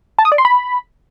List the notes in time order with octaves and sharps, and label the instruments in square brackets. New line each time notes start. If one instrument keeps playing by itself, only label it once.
[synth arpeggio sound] A5
D#6
D5
C6
B5